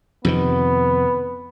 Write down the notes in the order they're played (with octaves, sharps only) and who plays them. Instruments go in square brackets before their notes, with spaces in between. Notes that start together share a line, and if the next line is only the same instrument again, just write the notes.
[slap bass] F2 C3 D#3 [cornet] B3